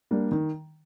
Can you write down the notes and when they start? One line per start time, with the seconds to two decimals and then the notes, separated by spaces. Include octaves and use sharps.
0.11 G3 A#3 D4
0.32 D#3